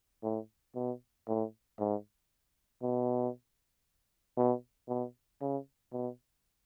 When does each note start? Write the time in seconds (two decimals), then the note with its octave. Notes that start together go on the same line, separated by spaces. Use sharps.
0.23 A2
0.76 B2
1.28 A2
1.79 G#2
2.82 B2
4.38 B2
4.89 B2
5.41 C#3
5.92 B2